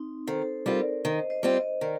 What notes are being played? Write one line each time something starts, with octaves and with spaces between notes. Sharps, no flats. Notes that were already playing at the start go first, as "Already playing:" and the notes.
Already playing: C4 D#4
D#3 A4 C5
G3 C4 F4 A#4 D5
D#3 C5 D#5
C5 D#5
G3 C4 F4
C5 D#5
D#3 A#4 D5